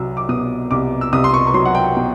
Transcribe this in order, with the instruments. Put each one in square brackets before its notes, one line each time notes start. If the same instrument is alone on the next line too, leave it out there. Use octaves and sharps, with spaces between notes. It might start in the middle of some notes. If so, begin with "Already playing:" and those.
Already playing: [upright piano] C2 F#3 E6
D6
B2 D#6
C2 D6
E6
C2 D#6
C6
C#6
C#6
F#3 C6
F#5
G5
B2 G5